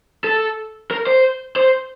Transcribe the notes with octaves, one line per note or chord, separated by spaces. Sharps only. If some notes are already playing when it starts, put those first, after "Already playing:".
A4
A#4
C5
C5